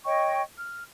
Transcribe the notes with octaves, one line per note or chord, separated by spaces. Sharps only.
C#5 D#5 G5 C#6
F6